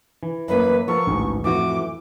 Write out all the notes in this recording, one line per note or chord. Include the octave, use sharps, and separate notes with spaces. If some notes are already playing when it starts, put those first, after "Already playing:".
E3
F#2 A#3 B4
F3 B3 A4 A#4 C#6
A1 D2 G#2
F2 A2 E3 F#4 D6